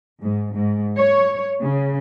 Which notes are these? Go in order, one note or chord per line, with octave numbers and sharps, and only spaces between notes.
G#2
G#2
C#5
C#3